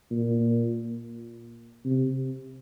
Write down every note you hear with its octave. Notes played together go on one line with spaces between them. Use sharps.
A#2
C3